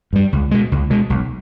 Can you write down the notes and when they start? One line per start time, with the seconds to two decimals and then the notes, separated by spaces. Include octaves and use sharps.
0.13 G2 G3
0.33 C#2
0.51 B2 G#3
0.72 C#2
0.90 B2 G#3
1.10 B1